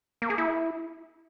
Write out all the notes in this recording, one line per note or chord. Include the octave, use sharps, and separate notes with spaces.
A#3
G#4
E4